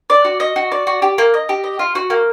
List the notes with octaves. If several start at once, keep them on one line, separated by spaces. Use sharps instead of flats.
D5
F#4
D#5
F#4
D5
F#4
G4
A#3
D#5
G4
D#5
F4
F#4
A#3